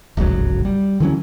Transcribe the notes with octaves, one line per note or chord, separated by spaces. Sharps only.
D1 G#1 C#2 F#3
G3
D3 E3 F#3 C#4